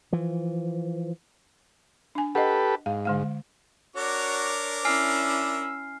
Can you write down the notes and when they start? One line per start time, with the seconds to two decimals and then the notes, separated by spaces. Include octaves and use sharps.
0.12 E3 F3
2.15 D4 G#5
2.35 G4 A4 B4 D#5 F#5
2.86 G#2 F5
3.05 D3 G#3 F5
3.96 D4 F#4 A#4 C#5 D6
4.85 C#4 E4 G#5 E6 F6 C7